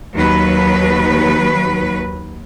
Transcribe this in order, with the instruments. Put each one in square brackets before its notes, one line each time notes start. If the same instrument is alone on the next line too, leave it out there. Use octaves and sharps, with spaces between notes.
[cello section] D#2 F#3 B4